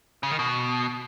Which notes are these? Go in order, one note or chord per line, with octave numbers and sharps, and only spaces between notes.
C#3
D#3
B2